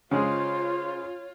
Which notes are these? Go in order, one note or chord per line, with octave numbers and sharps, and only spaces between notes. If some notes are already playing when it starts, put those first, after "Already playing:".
C#3 G#3 F4 G#4 C5 C#5